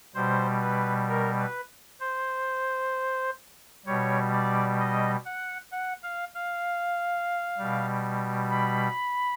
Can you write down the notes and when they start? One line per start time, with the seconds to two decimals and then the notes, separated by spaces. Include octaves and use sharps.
0.14 B2 G3 C5
0.61 B4
1.08 A#4
1.39 B4
2.00 C5
3.86 B2 G3 C#5
4.32 D5
4.79 D#5
5.25 F#5
5.72 F#5
6.03 F5
6.35 F5
7.58 B2 G3
8.50 B5